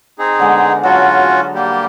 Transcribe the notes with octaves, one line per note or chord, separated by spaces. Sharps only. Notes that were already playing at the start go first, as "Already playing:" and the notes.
C4 D#4 G#4
D3 G#3 B3
F#3 C#4 F4 F#4 A4
G3 A#3 G4